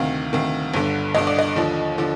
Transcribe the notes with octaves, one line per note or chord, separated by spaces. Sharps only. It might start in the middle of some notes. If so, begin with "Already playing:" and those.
Already playing: D2 C3 D#3 F5
D2 C3 D#3
G1 G2 D3
G1 G2 D3 D#5
D5
D#5
D#2 D3 F3
D3 F3